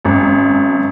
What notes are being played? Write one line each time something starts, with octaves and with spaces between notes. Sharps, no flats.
G#1 F#2